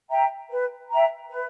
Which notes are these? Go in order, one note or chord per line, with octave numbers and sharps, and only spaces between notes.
E5 G5 A#5
B4
E5 G5 A#5
B4